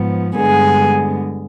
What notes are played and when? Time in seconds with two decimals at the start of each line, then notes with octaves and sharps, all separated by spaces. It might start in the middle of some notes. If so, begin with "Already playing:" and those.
Already playing: G#2 F3 B3
0.36 G2 D3 G#3 B3 G#4